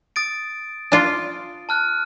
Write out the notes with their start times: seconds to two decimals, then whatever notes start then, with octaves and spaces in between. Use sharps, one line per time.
0.16 D#6 A6 D7
0.92 D4 F4
1.69 A5 F6 F#6